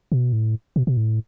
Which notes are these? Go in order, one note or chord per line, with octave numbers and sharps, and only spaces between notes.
B2
A2
B2
B2
A2